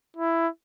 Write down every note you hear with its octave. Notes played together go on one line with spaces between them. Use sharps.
E4